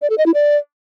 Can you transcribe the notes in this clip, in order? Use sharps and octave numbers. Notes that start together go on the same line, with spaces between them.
D5
A4
D#5
E4
D5